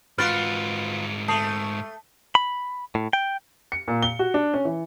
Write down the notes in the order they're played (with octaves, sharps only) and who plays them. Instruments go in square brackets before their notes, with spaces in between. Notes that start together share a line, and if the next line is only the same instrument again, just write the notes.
[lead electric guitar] G#2 F#4 [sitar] F4 B4 [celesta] F6 A6 D7
[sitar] A3 [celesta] A5 D#6 C7
[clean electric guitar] B5
A2
G5
[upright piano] C#7
A#2
G7
F#4
D4
C#4
E3